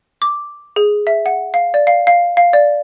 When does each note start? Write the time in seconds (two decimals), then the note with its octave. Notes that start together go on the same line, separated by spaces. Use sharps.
0.22 D6
0.76 G#4
1.07 E5
1.26 F#5
1.54 F5
1.74 D5
1.87 F5
2.07 F5
2.37 F5
2.53 D5